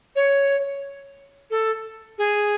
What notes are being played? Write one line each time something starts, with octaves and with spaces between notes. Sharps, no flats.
C#5
A4
G#4